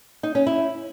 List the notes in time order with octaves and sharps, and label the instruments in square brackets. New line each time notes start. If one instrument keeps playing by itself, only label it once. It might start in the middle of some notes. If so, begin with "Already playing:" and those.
[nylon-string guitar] D#4
C#4
E4